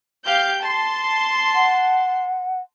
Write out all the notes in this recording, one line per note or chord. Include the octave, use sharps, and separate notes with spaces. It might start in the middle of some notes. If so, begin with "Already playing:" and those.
G4 F5 G6
A5 C6
F#5